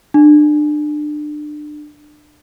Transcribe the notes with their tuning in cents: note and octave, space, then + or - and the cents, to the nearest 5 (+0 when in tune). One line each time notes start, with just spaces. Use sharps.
D4 +30